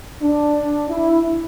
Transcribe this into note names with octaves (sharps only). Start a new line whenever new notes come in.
D4
E4